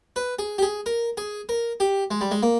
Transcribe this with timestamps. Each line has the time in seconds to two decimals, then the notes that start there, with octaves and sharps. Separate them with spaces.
0.16 B4
0.39 G#4
0.58 G4
0.62 G#4
0.86 A#4
1.17 G#4
1.49 A#4
1.80 G4
2.11 G#3
2.21 G3
2.31 G#3
2.43 A#3